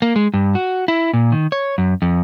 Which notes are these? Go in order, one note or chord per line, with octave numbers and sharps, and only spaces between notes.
A#3
G#3
G2
F#4
E4
A#2
D#3
C#5
F#2
F2